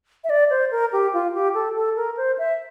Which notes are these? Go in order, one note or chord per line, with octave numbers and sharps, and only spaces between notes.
E5
D5
C5
A#4
G4
F4
G4
A4
A4
A#4
C5
E5